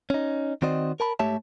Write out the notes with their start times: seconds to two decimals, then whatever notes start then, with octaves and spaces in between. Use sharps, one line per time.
0.10 C#4 D#4
0.62 D#3 C4 F#4 C5 D5 D#5
1.00 A#4 A5 B5
1.19 G#2 A3 G4 C#5 E5 A5